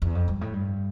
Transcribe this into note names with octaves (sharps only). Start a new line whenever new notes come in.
E2
F2
G2
A2
G2